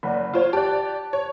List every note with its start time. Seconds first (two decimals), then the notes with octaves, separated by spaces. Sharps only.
0.03 F#1 D5 F#5 B5
0.34 F4 C5 C#5
0.53 G4 D5 A5 F#6
1.13 C#5